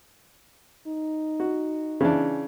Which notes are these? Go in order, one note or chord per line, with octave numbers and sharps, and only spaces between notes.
D#4
F#4
C#3 E3 D4